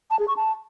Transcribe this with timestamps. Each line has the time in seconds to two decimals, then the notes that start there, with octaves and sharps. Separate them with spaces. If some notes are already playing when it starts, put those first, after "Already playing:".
0.11 A5
0.19 G#4
0.28 C#6
0.37 A5